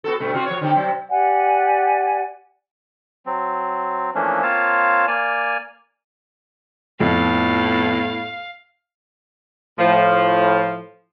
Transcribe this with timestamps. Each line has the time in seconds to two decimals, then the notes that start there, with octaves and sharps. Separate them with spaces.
0.04 B3 F#4 A4
0.20 G2 B2 A3
0.34 C3 F4 F#4
0.46 F3 C#5
0.61 D3 C4 G4
0.73 C3 F#3
1.09 G4 D5 F#5 G#5
3.26 F#3 C4
4.15 E3 F3 A3 A#3 C#4 D4
4.43 A#3 C4 F4 C#5 F5 A5
5.07 A#3 D5 G#5 F6
7.00 F2 A2 B3 F5
9.78 A2 F3